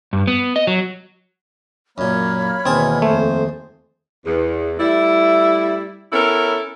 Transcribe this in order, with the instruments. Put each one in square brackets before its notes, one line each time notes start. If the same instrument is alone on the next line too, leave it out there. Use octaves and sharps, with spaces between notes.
[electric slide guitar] G2
B3
D#5
F#3
[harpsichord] F#2 A#2 [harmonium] A#3 [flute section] C#5 B5 F6
[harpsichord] D#2 G#4 A5 [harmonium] B2 E3 [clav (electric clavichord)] C4
[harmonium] F2 C5 [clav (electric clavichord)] A3
[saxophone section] E2
G3 A3 E4
B3 C#4 E4 A4 A#4